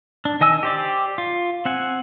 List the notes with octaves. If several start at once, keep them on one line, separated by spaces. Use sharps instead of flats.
D4
D#3 D#5 G#5 E6
G4 C5 D5
F4
C4 F#5 G#5